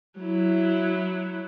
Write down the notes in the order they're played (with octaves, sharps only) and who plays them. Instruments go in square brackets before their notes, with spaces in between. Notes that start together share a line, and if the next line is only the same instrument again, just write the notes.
[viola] F#3 E4